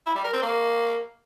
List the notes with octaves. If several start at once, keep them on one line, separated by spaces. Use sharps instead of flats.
E4
G3
A#4
C4
A#3